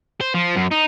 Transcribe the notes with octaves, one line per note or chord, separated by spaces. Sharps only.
C5
F3
F#2
D#4